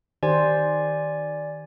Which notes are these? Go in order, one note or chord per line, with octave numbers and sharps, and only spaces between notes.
D#3 G4 C5 D5 G#5